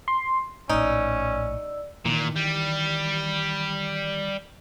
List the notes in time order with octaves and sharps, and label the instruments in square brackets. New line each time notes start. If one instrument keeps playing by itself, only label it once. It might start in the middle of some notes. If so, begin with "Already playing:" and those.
[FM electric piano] C6
[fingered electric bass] A#1 A2 [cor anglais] C#4 [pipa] D#4 [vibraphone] D5 E6
[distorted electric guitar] A#2 [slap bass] D#3 E3
[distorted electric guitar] G3